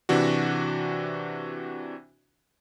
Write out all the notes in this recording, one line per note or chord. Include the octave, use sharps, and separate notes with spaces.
C3 E3 D4 F#4